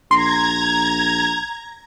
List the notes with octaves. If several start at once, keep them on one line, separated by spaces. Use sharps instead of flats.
A#1 A#5 C6 G#6